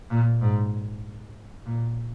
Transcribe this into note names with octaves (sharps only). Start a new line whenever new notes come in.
A#2
G#2
A#2